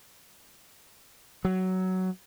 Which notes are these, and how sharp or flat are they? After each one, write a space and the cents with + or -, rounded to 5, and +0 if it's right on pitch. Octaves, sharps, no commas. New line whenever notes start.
F#3 +10